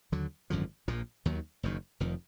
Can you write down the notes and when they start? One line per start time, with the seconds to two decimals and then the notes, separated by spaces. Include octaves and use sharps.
0.12 D#2 D3 F#3
0.50 G#1 F#2 D3 F3
0.88 A#1 A#2 F3
1.25 D#2 D#3 F#3
1.63 F#1 F#2 D#3
2.00 F1 F2 D#3